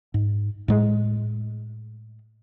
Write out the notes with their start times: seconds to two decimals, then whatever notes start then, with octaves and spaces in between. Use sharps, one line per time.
0.14 G#2
0.68 A2 G#3